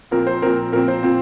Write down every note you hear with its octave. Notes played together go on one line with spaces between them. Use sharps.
A#2 F3 C4 A#4
C5
A#2 F3 C4 A#4
A#2 F3 C4 A#4
C5
A#2 F3 C4